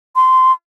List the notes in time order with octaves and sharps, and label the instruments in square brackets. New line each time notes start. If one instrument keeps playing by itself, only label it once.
[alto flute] C6